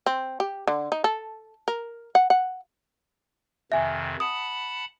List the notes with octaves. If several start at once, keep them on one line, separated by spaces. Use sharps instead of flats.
C4
G4
D3
D#4
A4
A#4
F#5
F#5
F2 C3 D#3 E5 G#5
F#5 A5 B5 D#6